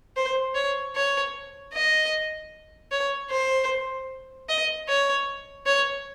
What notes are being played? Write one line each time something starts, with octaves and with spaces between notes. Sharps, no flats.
C5
C#5
C#5
D#5
C#5
C5
D#5
C#5
C#5